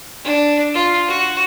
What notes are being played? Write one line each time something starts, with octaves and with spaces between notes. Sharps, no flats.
D4
F4
F#4